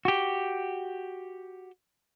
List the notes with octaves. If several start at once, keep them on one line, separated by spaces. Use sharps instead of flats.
F#4 G4